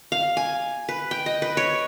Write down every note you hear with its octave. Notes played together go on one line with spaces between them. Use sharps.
F5
G#5
B4
G5
D#5
B4
C#5